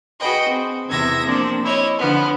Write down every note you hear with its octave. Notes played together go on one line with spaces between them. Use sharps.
F#4 G#4 B4 D#5 G5
C4
E2 C3 E5 G#6 A#6
F3 A#3 C4 D4
E4 C#5 D#5
D3 F3 B3